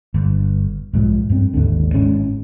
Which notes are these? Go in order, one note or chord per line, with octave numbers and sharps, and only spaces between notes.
G1
B1 G#2 F3
G2 C4
G#1 D#2 D3
G#1 G#2 G#3 C#4